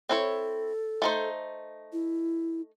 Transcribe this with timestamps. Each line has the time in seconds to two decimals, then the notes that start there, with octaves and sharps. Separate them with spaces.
0.09 C4 E4 A4 C#5
1.02 A3 D#4 C5
1.93 E4